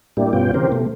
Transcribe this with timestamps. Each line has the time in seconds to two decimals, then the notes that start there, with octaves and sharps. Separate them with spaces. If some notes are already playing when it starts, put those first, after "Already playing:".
0.17 A2 G3 A#3 D4 E4 G4
0.33 G2 B2 B3 C#4 F4 G5
0.54 C#3 E3 C4 G4 A#4 C5
0.72 B2 A3